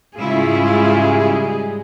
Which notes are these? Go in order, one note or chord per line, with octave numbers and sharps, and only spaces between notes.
G#2 C#3 G3 G#3 E4 F4 G#4